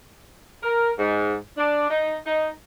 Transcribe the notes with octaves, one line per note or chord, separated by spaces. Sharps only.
A#4
G#2
D4
D#4
D#4